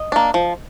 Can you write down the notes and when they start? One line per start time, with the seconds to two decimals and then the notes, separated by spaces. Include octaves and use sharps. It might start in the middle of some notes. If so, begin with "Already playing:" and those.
Already playing: D#5
0.12 A#3 D4
0.34 F3